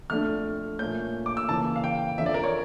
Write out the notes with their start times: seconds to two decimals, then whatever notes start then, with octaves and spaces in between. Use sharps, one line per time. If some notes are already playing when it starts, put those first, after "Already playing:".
0.10 F2 D3 A3 D4 F6
0.79 A#2 A3 C#4 G6
1.26 D6
1.37 E6
1.49 C#3 E3 A#3 C#4 A5
1.76 F5
1.84 G5
2.18 F2 D3 F3 C#4 E5
2.26 D5
2.34 A#4
2.44 C#5